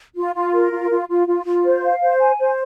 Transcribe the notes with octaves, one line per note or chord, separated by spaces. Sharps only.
F4
F4
A#4
F4
F4
F4
F4
F4
C5
F5
C5
G#5
C5